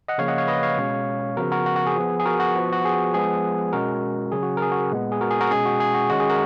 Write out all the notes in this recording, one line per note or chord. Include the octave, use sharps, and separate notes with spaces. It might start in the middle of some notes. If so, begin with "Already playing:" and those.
D#5 F#5
C#3 F3 A#3 C#5 F5
D#5 F#5
C#5 F5
B4 D#5
C#5 F5
B2 G#3 C#4
C#3 F3 B3 F#4 A#4
F#4 A#4
F#4
F#4
G#4
F3 B3
G#4
F#4 A#4
F#4
F3 B3
F#4
G#4
F3 G#3 B3 G#4
B2 G#3 C#4 F#4 A#4
C#3 F#3 C#4 G#4
F#4
A#4
G#4
F#4
A#2 G#3 B3
G#4
F#4 A#4
G#4
F#4 A#4
B2 G#3 C#4 G#4
F#4
G#4
F#4
D#3 G#3 C#4 F#4
G#4
F#4 A#4